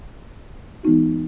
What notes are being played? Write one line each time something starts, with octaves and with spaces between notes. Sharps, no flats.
E3 G#3 B3 D#4 F#4